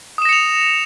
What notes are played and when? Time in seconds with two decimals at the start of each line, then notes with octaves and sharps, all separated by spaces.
0.18 D#6
0.22 E7
0.25 A#6
0.29 C#7
0.33 F7